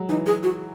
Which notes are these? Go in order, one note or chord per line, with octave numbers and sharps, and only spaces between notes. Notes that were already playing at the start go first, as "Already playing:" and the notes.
Already playing: F#3 G#3
E3 D#4
G#4
F#4